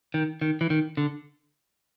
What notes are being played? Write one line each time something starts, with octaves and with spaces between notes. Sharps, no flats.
D#3
D#3
E3
D#3
D3